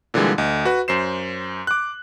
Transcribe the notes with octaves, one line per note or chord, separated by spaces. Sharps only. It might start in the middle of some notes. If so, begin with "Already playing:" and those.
A#2 D3 E3 G3 G#3
D2 D#5
F#4 B4
F#2 C5 C7 E7
D6 F#6